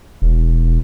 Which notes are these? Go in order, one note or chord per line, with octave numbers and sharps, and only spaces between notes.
E1